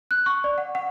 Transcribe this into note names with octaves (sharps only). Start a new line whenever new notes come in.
F#6
C#6
D5
F#5
F#5